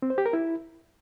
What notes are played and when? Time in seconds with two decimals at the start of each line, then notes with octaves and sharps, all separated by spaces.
0.02 C4
0.10 C5
0.18 G4
0.26 A#4
0.33 E4